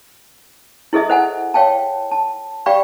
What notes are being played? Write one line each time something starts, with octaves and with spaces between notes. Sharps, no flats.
E4 G#4 A4 D#5 E5
C5 F#5 G#5
C#5 F5 G5 A5
A5
G4 D5 F5 G5 B5 C#6